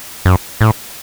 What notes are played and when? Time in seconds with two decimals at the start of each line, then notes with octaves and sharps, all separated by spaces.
0.25 F#2
0.61 A2